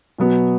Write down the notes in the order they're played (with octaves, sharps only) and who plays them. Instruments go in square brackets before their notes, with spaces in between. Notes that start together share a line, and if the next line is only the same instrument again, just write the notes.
[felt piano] B2 F#3 B3